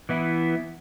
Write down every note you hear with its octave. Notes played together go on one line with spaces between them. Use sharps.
E3 B3 E4